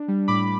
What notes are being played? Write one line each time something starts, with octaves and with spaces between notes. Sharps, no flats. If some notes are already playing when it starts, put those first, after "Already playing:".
Already playing: D4
G3
A2 B5 D6